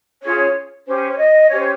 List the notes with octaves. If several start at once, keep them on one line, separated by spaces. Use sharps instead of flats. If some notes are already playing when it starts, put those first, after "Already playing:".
C#4 F4 G#4 C#5
C#4 G4 C5
C#5
D#5
C#4 G4 C5 C#5